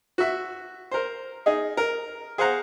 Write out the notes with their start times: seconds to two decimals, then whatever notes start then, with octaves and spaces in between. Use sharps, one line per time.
0.18 F#4 E5
0.91 A#4 C5
1.46 D#4 G#4
1.77 A#4
2.38 G#4 C5 F5 F#5 A#5